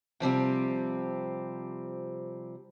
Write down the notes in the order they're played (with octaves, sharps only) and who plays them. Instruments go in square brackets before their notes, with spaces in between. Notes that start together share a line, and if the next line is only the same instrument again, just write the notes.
[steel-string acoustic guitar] C3 F3 G3 C4